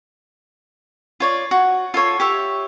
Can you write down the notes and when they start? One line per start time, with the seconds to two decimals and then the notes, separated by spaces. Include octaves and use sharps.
1.20 F4 C#5 D5
1.51 F#4
1.94 F4 A4 C#5 C6
2.20 G4 C#5 E5